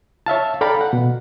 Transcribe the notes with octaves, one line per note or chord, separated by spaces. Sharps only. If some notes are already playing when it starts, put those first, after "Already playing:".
C#5 E5 F5 A5
A4 D5 F5 G5 A#5 B5
F#5
B2